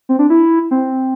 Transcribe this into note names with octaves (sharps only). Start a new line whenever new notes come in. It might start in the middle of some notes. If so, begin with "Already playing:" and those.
C4
D4
E4
C4